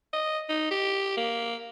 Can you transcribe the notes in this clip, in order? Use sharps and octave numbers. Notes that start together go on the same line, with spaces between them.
D#5
D#4
G4
A#3